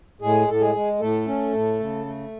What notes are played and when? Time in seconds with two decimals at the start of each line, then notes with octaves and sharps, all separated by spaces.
0.21 A2 G#3 G#4
0.48 A2 A4
0.61 G#3 G#4
0.75 G#3
1.00 A2 A3 A4
1.27 C#4
1.53 A2
1.80 C#3
2.05 A3